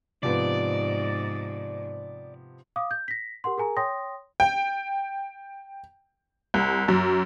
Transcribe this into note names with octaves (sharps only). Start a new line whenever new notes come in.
G#2 C3 F3 B3 D5
F5 D6 D#6
G6
A#6 B6
G4 A#4 F#5 C6
G#4 A#4 G#5 A#5
C#5 G5 C6 D#6 A#6
G5
C2
F#2